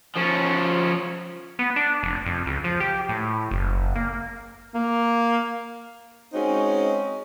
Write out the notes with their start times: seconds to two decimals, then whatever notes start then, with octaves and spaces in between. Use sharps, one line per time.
0.16 F3 C#4
1.59 B3
1.76 D4
2.03 F1
2.26 F2
2.46 C#2
2.64 F3
2.80 G4
3.09 A2
3.51 F#1
3.95 A#3
4.74 A#3
6.33 G#3 C4 C#4 D#4 F#4